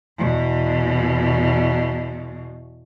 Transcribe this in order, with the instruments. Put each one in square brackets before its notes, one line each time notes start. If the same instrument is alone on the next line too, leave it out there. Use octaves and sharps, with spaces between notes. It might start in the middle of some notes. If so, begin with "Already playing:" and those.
[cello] E2 B2